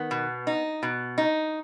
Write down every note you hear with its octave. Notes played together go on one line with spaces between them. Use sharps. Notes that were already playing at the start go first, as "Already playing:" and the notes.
Already playing: D#3 B3
B2
D#4
B2
D#4